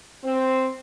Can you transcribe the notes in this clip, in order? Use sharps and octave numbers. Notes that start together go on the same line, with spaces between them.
C4